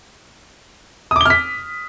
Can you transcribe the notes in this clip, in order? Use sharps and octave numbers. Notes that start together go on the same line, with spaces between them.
D6 D#6 F6 B6 G7